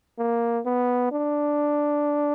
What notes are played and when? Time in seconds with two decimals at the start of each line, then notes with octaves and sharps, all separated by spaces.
0.18 A#3
0.65 B3
1.12 D4